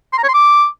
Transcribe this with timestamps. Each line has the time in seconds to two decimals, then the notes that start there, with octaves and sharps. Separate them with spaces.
0.13 C6
0.18 A#5
0.23 C#5
0.29 C6
0.34 D6